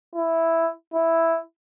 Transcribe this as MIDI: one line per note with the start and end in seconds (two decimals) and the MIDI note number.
0.16 0.71 64
0.94 1.39 64